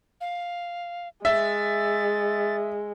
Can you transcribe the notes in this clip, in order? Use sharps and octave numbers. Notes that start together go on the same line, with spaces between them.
F5
G#3 E5 A6